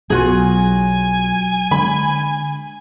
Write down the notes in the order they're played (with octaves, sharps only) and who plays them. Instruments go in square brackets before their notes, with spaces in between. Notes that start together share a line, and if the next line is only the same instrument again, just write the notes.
[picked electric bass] B1 B2 [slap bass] F#3 [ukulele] F4 F#4 G#4 [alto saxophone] G#5
[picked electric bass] D3 G#3 D4 [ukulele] B5